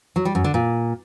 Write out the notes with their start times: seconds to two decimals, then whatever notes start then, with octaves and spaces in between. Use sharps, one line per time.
0.16 F#3
0.25 G3
0.35 F#2
0.44 D3
0.54 A#2